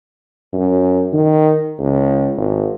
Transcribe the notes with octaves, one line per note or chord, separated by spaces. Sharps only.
F#2
D#3
C#2
G#1